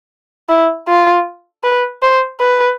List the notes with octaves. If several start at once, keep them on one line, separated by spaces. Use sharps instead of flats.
E4
F4
B4
C5
B4